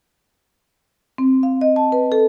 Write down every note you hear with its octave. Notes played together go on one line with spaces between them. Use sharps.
C4
F5
D#5
A5
B4
A4